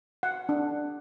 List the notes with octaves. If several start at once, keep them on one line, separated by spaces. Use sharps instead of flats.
F#5
D4